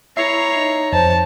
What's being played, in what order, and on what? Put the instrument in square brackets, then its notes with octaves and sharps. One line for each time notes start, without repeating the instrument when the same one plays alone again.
[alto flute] E4 [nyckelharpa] C#5 A#5 [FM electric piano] E5 C7
[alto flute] D#4
[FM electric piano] F2 [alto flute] C5 [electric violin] A5